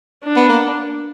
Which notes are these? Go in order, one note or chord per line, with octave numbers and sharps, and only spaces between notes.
D4
B3
A#3